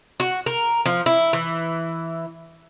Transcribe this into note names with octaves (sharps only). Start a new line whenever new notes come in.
F#4
A#4
F3
E4
E3